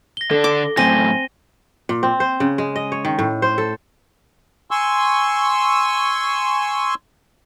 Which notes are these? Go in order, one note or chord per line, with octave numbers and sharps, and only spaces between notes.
A#6 G7
D3 D4 A4
D6
F#2 A2 C4 G#5 A#6 D#7 G7
A#2
C4
C5
C#3
G#3
D#5
C#5
D#3
A2
C5
A4
G#5 C6 C#6 E6